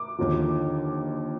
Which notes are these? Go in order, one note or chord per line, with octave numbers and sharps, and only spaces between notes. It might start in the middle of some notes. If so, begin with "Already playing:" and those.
Already playing: D6
D#2 D3 F3